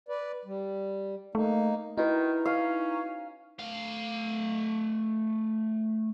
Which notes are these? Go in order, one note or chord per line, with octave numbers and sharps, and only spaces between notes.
B4 D5
G3
A3 A#3 D#4
D#3 D#4 E4 F#4 B4
C#4 F5
A3 F5